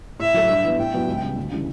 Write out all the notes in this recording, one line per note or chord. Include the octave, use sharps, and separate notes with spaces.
A2 E5
F#3 A3
G2
E3 B3
A2 G5
F#3 B3 D4 F#4
C#2
C#3 G3
D2
C#3 E3 G3